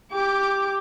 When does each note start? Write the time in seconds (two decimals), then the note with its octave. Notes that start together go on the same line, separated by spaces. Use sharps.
0.12 G4 D6